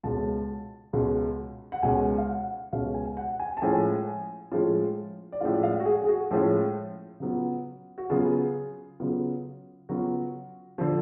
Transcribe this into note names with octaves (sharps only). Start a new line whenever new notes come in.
C#2 B2 G#3 C#4 A5
C#2 B2 G#3 C#4
F#5
C#2 B2 G#3 C#4 G#5
F5
F#5
C#2 B2 G#3 C#4 F5
G#5
F#5
G#5
A5
A2 F3 G#3 C#4 F4 G#5
A2 F3 G#3 C#4 F4
D5
A2 F3 G#3 C#4 F4 F5
D5
F5
F#4
G#4
G#4
F#4
A2 F3 G#3 C#4 F4
C#3 F#3 B3 F4
F#4
C#3 F#3 B3 F4 G#4
C#3 F#3 B3 F4
C#3 F#3 B3 F4 F#4
D3 F3